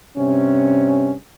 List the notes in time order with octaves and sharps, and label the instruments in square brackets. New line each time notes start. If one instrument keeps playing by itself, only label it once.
[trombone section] G2 C3 C#4